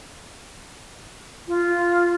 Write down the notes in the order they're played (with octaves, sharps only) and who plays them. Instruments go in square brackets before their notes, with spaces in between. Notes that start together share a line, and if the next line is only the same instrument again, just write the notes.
[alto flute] F4